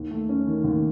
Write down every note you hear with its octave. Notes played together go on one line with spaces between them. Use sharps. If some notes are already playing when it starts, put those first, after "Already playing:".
Already playing: D#2
A3
C#4
D#3
D#2